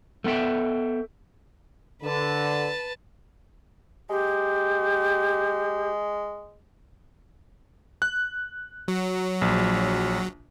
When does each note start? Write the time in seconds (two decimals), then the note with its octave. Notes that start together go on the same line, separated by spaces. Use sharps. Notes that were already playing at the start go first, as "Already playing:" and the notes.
0.24 A3 B3 A4 E5 G5
2.03 D3 B4 A5
4.10 G#3 G4
8.02 F#6
8.88 F#3
9.42 A#1